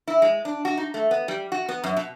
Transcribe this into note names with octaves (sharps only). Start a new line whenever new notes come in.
E4
G#3
D4
F#4
D#4
A3
B3
G3
F#4
B3
F#2
B2